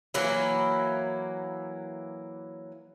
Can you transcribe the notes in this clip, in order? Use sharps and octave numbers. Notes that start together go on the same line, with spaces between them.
E3 F#3 A#3 E4